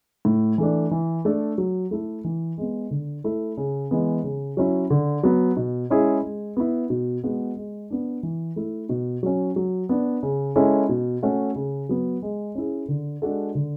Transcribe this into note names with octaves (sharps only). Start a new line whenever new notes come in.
A2
E3 A3 D4
E3
A3 D4 A4
F#3
A3 E4 A4
E3
G#3 B3
D3
A3 E4 A4
C#3
E3 G#3 B3
C#3
F#3 C#4 E4
D3
F#3 B3
B2
G#3 C#4 E4 G#4
G#3
B3 E4
B2
G#3 B3 F#4
G#3
B3 D4
E3
A3 E4
B2
F#3 C#4
F#3
B3 D4
C#3
G#3 C#4 E4 A4
B2
A3 C#4 F#4 A4
C#3
F#3 B3
G#3
C#4 E4 G#4
D3
G#3 D4 F#4 A4
D3